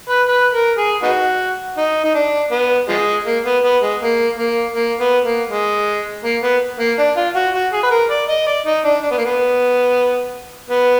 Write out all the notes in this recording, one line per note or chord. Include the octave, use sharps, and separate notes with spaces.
B4
B4
A#4
G#4
B3 D#4 F#4
D#4
D#4
D4
B3
F3 G#3
A#3
B3
B3
G#3
A#3
A#3
A#3
B3
A#3
G#3
A#3
B3
A#3
D4
F4
F#4
F#4
G#4
B4
A#4
D5
D#5
D5
D#4
D4
D4
B3
A#3
B3
B3